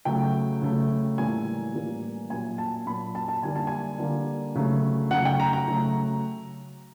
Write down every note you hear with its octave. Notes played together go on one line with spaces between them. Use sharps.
C#3 F#3 A3 G5
C#3 F#3 A3
A2 E3 G3 A#3 G#5
A2 E3 G3 A#3
A#2 F#3 A#3 G#5
A5
A#2 F#3 A#3 B5
A5
A5
D3 G3 A#3 G#5
A5
G#5
D3 G3 A#3
C#3 F#3 A3
C#3 F#3 A3 F#5
G5
A#5
A#5
C#3 F#3 A3